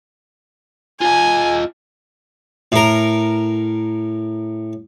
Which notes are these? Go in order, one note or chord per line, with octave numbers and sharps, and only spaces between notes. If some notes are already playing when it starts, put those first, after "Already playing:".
F4 D#5 G#5
A2 A#4